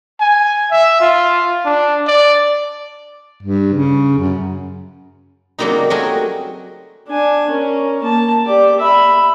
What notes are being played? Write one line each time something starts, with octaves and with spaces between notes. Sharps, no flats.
G#5
E5
F4
D4
D5
G2
C#3
F#2
C#3 F#3 G3 A#3 C4 D#4
F#3 A3 C4 F#4 G#4 A#4
D4 G#5
C#4 A#4
A#3 A5
G4 D5
E5 B5